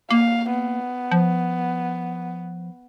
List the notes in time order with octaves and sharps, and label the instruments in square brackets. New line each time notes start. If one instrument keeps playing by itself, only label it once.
[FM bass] A#3 [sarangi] F5
[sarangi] B3
[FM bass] F3